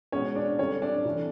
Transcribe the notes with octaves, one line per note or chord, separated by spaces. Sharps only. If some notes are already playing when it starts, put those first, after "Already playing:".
B2 G#3 B3 C#4 C#5
D4 D5
D3 G3 C4 C#4 C#5
D4 D5
C3 E3 A3 C#4